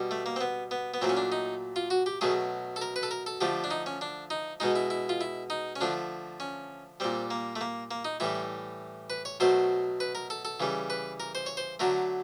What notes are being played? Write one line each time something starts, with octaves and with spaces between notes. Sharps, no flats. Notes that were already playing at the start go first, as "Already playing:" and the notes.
Already playing: B2 G3
A3
A#3
C4
B3
B3
B3
A#2 F#3 A3 C4
C#4
D4
D#4
F4
F#4
G4
B2 F#3 A3 G#4
A4
A#4
B4
A4
A#4
A4
D3 F3 A3 G4
D4
D#4
C#4
D4
D#4
B2 G#3 D#4
E4
E4
F4
E4
D#4
C#4
D3 F3 A3 D4
C#4
A#2 G3 C4
A#3
A3
A#3
A#3
D#4
A2 E3 G3 E4
B4
C#5
B2 F#3 A3 C5
B4
A#4
A4
A4
C#3 E3 G3
B4
A#4
C5
C#5
C5
D3 F#3 A3 A#4